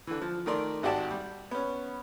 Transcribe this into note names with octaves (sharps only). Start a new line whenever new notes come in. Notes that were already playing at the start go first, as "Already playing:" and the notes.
D3 E3
F3
D#3 A3 A#4 D5 C6
G#1 F#4 G4 D5 F#5 A5
G3
B3 C#4